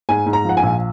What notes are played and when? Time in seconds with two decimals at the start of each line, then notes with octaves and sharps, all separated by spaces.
0.09 G#2 G#5
0.26 G#2
0.33 A#5
0.45 F3 F#5
0.57 G#5
0.63 A#1